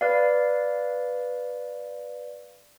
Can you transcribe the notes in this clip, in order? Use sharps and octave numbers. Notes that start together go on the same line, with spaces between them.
B4 D5 F5